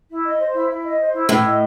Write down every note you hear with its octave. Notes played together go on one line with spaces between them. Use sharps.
E4
D#5
C5
E4
E4
D#5
C5
E4
A2 E4
D#5